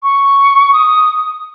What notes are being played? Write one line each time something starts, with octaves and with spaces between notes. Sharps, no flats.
C#6
D#6